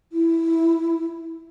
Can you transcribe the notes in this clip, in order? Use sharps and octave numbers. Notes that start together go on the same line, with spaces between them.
E4